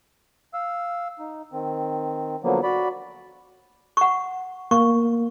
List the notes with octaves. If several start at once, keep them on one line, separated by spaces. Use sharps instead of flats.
F5 E6
D#4
D#3 C4
D3 F3 F#3 A#3 B3
F#4 D5 B5
F#5 C#6
A#3 C#6